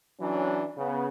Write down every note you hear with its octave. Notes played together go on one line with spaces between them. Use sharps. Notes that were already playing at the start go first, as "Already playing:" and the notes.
E3 F#3 C#4 D4
C#3 B3